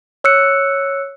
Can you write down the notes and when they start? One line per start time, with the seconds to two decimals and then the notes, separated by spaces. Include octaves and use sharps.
0.24 C#5 E6 F#6 C#7